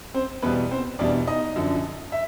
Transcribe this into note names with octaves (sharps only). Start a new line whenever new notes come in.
C4 C5
E2 B2 G3 B3 B4
C4 C5
E2 B2 G3 D4 D5
D#4 D#5
F#2 D3 F3
E5